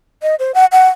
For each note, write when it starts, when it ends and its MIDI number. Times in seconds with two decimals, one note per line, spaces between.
0.22 0.35 75
0.39 0.52 72
0.54 0.65 78
0.72 0.87 78